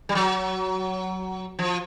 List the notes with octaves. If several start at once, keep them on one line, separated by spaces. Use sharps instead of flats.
G3
F#3
F3